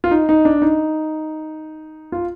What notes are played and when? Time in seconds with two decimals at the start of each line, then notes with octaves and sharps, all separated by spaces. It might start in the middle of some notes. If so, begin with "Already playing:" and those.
0.04 F4
0.11 D#4
0.29 D#4
0.45 D4
0.62 D#4
2.12 F4